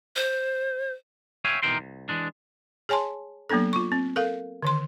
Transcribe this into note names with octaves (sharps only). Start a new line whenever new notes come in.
C5
C#5 E5 F5 G5 G#5
B2 E3 D#4 A#4 G5 C6
C2
E3 G#3 D4
G#4 C#5 G#5 A5 C6
F#3 A#3 B3 D4 A4
F4 C#6
C4
A4 A#4 F5
D3 D#3 C6